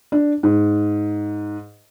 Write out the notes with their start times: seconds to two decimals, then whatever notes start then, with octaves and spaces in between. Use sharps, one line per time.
0.12 D4
0.43 G#2